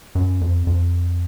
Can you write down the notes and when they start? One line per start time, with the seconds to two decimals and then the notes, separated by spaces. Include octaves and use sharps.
0.15 F#2
0.41 F2
0.67 F2